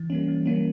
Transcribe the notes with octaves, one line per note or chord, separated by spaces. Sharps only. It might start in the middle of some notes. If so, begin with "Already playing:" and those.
Already playing: E3
G3 A#3 C#4
E3
G3 A#3 C#4